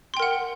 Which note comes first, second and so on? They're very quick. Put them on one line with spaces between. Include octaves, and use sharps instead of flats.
C6 G5 A#4 F#5